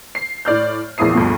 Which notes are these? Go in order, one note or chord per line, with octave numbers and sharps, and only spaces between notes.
C7
A2 D5 F6 G6
A#1 E2 A#2 E4 D#6 C7
D2 G2 B2 F3